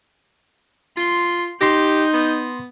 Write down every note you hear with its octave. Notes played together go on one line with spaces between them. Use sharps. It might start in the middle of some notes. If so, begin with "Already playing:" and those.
F4 C6
D#4 G4 C6 G6 A#6
B3